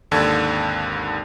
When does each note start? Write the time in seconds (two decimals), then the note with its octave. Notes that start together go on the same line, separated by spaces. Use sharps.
0.11 G#1 D#2 D3 A4 G#6